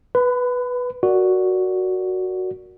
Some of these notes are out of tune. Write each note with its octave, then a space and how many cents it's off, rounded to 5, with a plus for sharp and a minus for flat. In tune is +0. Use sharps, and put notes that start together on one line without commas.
B4 +0 B5 +35
F#4 +0 A#4 +0 D5 +0